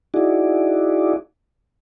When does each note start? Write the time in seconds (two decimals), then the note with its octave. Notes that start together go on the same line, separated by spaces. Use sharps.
0.14 D#4 E4 F#4 G#4 D5